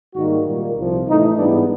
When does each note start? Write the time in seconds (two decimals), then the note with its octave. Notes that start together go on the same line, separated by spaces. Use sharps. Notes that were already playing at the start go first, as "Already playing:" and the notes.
0.15 G#2 D#3 G3 A#3 F#4
0.46 A#2 G3 A#3
0.76 C2 C3 F3
1.07 A2 E3 A3 D#4
1.37 G#2 E3 G3 B3 D4